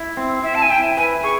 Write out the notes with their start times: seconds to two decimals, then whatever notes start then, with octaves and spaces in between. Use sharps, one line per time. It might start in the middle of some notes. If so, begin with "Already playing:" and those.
Already playing: E4
0.17 C4
0.43 E4 E5
0.55 A5
0.62 G#5
0.70 E4 G5
0.97 B4 G#5
1.24 G#4 C#6